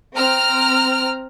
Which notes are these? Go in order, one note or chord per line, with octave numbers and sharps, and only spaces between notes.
C4 A#5 F6